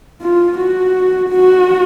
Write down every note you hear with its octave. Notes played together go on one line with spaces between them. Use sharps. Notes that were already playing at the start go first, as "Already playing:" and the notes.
F4
F#4
F#4